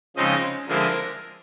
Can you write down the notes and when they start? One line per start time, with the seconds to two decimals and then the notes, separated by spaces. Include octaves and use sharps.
0.16 C#3 F3 G#3 C4 D#4 D#5
0.67 D3 F3 G#3 C4 E4 A#4